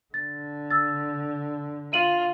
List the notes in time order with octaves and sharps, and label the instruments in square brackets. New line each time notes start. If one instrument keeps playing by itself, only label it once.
[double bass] D3 [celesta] A6
[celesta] E6 A6
[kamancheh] F4 [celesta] D#7 F#7